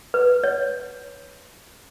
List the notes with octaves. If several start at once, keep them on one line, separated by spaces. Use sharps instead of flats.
B4
C#5